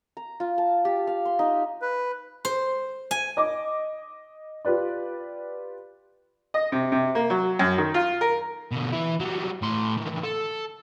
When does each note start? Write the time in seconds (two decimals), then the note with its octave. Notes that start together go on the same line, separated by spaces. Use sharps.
0.17 A#5
0.40 F4
0.58 A5
0.85 G4
1.07 F5
1.25 C6
1.39 D#4
1.82 B4
2.45 C5
3.11 G#5
3.37 D#5 D6
4.65 F4 G4 B4 D5
6.54 D#5
6.72 C3
6.92 C3
7.15 A#3
7.30 F#3
7.59 F#2
7.78 D#3
7.94 F4
8.21 A#4
8.71 B2 D3
8.92 E3 E4
9.20 F#3 G3
9.62 A2 C6
9.97 D#3 E3
10.24 A4